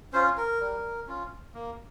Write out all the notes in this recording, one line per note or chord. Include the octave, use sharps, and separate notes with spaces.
C#4 F4 C5
A#4
G3
C#4 F4
A#3